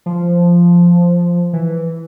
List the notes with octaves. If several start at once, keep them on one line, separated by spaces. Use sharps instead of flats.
F3
E3